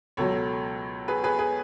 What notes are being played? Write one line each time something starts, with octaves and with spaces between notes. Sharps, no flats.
C#2 B2 F#3 A4 C#5
G#4 B4
G#4 B4
G#4 B4